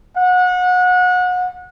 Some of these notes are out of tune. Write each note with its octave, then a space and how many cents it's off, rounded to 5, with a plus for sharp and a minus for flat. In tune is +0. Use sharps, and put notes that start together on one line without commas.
F#5 -30